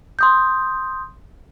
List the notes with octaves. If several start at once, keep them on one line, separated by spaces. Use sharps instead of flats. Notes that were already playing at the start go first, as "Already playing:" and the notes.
C6 D#6 G6